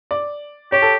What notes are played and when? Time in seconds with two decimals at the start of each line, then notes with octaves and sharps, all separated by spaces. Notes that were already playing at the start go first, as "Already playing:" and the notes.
0.11 D5
0.72 G4 C#5
0.82 A4